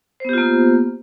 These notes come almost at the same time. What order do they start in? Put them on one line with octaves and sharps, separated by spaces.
C5 B3 G4 F4 A#3